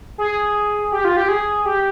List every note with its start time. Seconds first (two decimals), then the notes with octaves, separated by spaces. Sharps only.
0.18 G#4
0.92 G4
1.05 F4
1.17 G4
1.28 G#4
1.65 G4